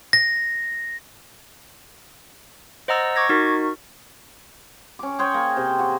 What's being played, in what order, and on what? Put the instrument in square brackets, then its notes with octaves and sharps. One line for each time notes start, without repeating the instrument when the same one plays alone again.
[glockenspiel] A#6
[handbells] C5 D#5 F#5 A#5 E6 A6
C#6 D6 G#6 A#6
D#4 F#4 A#4 C#6
[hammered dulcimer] C#4 D6
G#4 C5 C#5 G5
A#3
C3
F#4